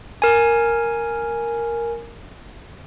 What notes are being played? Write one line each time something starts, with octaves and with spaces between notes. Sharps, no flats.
A#4 G#5